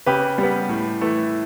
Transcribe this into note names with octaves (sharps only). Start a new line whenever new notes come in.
C#3 G4 B4
G3
B3
A2
E3 A3